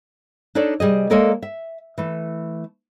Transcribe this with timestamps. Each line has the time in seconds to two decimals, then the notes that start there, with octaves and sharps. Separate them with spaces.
0.55 D4 D#4 A4 C#5 D5
0.80 C3 G3 G#4 D#5
1.10 G#3 A#3 A4 A#4 C#5 D5
1.43 E5
1.98 E3 A3